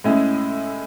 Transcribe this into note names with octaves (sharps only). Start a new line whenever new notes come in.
A2 G#3 C#4 E4 G#4